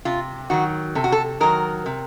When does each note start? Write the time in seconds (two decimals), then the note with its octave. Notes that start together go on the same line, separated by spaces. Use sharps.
0.05 C3 F4
0.50 D#3 F#3 F#4
0.95 C3 A4
1.04 F#4
1.12 A4
1.40 D#3 F#3 A#4
1.86 C3